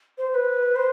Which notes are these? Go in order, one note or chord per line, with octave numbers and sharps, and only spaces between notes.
C5
C5
B4
C5